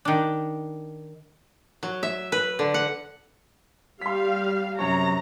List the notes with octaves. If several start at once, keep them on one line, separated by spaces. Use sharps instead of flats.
D#3 D4
F#3
E5
B4
D3
F#5
G3 F5 C6 B6
F#2 C3 C#5 A#5